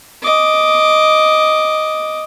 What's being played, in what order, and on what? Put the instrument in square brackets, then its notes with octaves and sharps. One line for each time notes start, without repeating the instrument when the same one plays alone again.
[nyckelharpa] D#5 D6